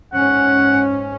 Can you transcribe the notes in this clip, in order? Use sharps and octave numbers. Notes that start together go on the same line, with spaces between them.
G#2 C#4 F#5